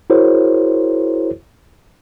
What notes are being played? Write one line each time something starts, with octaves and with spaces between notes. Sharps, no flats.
E4 F#4 G#4 A#4 C5 C#5